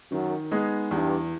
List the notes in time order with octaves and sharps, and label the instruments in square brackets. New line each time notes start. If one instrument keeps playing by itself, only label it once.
[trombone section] F#2 [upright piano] D#3
[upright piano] G#3 B3 D#4 G#4
[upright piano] E2 [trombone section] G2